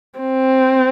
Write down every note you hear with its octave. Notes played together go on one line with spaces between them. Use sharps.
C4